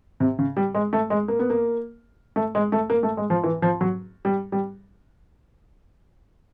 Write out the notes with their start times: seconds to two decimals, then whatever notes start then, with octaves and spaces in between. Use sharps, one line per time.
0.20 C3
0.39 C#3
0.57 G3
0.75 G#3
0.93 A3
1.10 G#3
1.28 A#3
1.39 B3
1.50 A#3
2.36 A3
2.55 G#3
2.72 A3
2.90 A#3
3.03 A3
3.17 G#3
3.30 F3
3.44 E3
3.62 F3
3.81 F#3
4.25 G3
4.52 G3